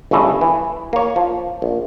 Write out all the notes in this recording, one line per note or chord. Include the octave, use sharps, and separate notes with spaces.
G1 C#3 E3 A3 D#5
E3
A#3 C#5
F3
A#1